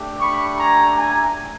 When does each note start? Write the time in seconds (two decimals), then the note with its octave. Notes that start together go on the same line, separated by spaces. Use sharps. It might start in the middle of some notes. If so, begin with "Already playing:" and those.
Already playing: A3 D4 G4
0.21 B5 C#6
0.57 G#5 A#5
0.94 G#5 A#5